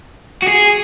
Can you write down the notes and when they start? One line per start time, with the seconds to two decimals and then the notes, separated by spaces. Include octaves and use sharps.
0.43 F#4
0.48 G#4